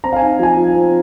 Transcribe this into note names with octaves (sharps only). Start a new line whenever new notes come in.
C4 A#5
F5
G#5
D#4
F3 G#5
F3
C4